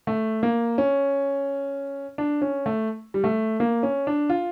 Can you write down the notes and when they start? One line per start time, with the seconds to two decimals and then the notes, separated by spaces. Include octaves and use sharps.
0.07 A3
0.43 A#3
0.78 C#4
2.18 D4
2.42 C#4
2.66 A3
3.14 G3
3.24 A3
3.60 A#3
3.83 C#4
4.07 D4
4.30 F4